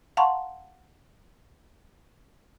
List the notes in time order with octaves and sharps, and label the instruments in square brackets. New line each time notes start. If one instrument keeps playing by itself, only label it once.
[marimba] F5 F#5 A5 A#5 C6 C#6